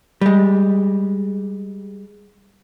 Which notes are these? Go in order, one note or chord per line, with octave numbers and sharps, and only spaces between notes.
G3 G#3